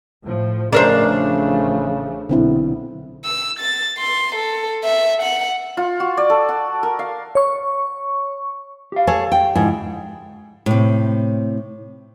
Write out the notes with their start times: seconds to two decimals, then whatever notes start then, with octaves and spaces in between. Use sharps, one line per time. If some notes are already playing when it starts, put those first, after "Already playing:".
0.22 A2 F3
0.73 A1 C#3 F3 A3 D4 A#4 C5
2.29 B1 D3 C4 E4
3.24 E6
3.59 A6
3.98 C6
4.35 A4
4.84 E5
5.22 F#5
5.77 F4
6.00 F#4
6.17 D5
6.30 A4
6.49 F#5
6.83 A#4
6.99 F5
7.35 C#5 C#6
8.92 G4 F5
9.07 G#4 A4 C#5
9.32 G5
9.55 G#2 D3 F3 E4
10.66 A2 C3